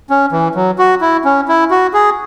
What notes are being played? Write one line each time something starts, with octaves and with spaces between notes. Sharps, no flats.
C#4
E3
F#3
F#4
E4
C#4
E4
F#4
G#4